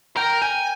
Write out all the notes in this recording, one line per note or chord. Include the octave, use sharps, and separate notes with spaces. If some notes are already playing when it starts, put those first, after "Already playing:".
A#4 G5
G5 G#5